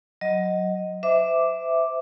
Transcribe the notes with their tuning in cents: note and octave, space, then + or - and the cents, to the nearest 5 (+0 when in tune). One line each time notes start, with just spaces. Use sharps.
F#3 +0 D#5 +0
C5 -35 E5 -5 D6 +0